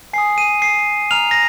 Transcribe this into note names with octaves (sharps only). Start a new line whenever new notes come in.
G#5 D#6 C7
D#7
C7
A#5 F6 F7
A#6